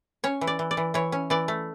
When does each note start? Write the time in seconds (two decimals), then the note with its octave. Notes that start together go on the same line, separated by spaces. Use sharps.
0.24 C#4 C#5
0.41 E3
0.47 D5
0.59 E3
0.71 D5
0.77 E3
0.94 E3 C#5
1.12 C#4
1.30 E3 D5
1.48 A3